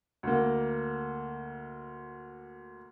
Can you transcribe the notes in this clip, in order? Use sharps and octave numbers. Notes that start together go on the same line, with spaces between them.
D2 A#3